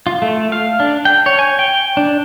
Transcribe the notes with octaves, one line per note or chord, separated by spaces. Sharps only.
F4
A3
F5
D4
G5
C#5
G#5
G5
D4